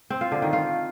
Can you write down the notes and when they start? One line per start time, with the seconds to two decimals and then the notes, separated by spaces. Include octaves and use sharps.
0.10 C4
0.21 F4
0.32 D3
0.42 D#3
0.53 F4